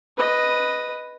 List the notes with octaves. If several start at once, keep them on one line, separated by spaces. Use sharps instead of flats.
B4 D#5